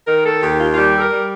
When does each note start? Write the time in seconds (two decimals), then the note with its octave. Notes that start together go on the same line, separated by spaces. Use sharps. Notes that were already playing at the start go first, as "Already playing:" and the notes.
0.07 D#3 A#4
0.25 A4
0.42 D#2 G4
0.59 F4
0.72 F4
0.77 G3 G4
0.96 A4
1.00 A#4
1.12 G3